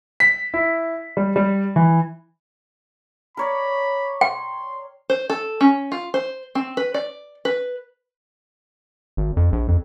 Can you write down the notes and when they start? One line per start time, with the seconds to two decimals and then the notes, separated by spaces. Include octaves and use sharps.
0.20 B6
0.54 E4
1.17 G3
1.36 G3
1.76 E3
3.37 A#4 C#5 D5 B5
4.21 G5 C6
5.10 C5
5.30 A4
5.61 C#4
5.92 F4
6.14 C5
6.55 C4
6.77 B4
6.94 D5
7.45 B4
9.17 G#1
9.37 F2
9.52 A#1
9.68 F2